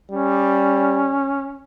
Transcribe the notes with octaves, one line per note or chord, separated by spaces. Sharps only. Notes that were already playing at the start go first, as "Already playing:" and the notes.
G3 C#4